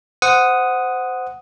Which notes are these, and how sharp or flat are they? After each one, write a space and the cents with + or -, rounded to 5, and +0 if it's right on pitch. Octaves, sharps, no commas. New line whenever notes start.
C5 -20 F#5 +0 D#6 +0